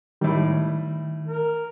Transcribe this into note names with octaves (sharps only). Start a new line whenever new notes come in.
A2 D#3 G3
A#4